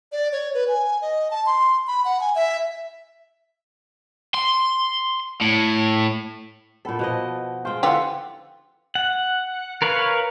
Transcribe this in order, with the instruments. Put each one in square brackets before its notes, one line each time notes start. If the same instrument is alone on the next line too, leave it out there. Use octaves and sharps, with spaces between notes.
[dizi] D5
C#5
B4
G#5
D#5
A5
C6
B5
F#5
G#5
E5
[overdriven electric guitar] C6
A2
[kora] A#2 A4 [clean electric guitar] B3
[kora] B2 F3 D#5
[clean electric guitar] G#3 F4 [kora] C5 G5
[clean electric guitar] D3 A4 F#5 [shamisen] E3 F4 G4
[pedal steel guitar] F#5
A#4 B4 C#5 F5